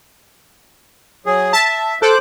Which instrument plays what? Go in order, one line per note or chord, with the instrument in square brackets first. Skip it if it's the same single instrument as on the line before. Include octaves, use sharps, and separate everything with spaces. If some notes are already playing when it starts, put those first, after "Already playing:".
[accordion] F#3 G#4
[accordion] E5 [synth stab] A5
[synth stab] A4 [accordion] C5 D6 F#6